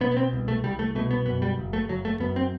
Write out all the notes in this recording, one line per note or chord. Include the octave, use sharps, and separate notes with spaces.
B2 B3
B3
C4
C2
A3
C2 G3
A3
B2 A3
B3
F#2 B3
G3
F#1
A3
F#1 F#3
A3
F#2 B3
C4